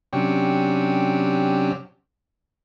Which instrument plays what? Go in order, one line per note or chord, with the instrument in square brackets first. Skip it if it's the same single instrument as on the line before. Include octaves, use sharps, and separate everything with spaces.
[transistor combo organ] C3 F#3 C#4 D4 G4